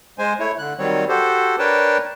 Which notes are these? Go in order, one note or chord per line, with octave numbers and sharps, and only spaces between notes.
G#3 C5 G#5
A3 E4 C#5
D3 F#6
D#3 F#3 G3 C4 C#5
F#4 G4 A4 C5
D4 A#4 B4 C#5 G5 A5